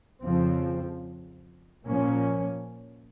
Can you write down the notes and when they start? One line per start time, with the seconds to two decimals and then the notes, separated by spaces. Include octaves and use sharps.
0.23 F2 C#3 F3 C4
1.86 A#2 F3 A#3 C#4